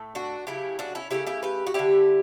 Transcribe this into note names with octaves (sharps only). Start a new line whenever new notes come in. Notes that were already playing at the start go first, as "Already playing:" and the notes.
Already playing: A2 A3
D4 F#4
C#3 F#3 A3 E4 G4
D4 F#4
C#4 E4
C#3 F#3 A3 E4 G4
E4 G4
G4 B4
F#4
D3 G3 E4 G4